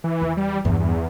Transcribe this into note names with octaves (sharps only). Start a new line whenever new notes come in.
E3
E2
G3
E2 G2 E3
E2